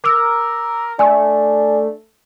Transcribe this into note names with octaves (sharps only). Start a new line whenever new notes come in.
A#4 D6 E6
A3 D4 G#5